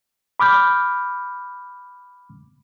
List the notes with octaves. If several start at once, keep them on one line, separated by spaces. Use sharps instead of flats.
B5 D6 F6 G6